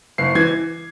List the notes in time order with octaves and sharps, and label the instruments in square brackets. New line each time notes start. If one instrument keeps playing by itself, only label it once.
[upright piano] F#1 C7
E3 G#6